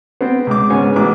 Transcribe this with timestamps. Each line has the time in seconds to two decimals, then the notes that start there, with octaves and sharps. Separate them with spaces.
0.21 B3 C4
0.47 C#2 D6
0.70 G#2 C#3 B3 C#5 G#5
0.96 A1 B2 E3 D6